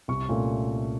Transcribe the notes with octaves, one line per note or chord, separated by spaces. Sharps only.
C2 C#6
A#2 A3 C#4